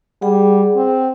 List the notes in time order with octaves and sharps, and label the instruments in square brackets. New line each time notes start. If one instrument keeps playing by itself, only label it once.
[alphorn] G3 [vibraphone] G#4 F#5
[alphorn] C4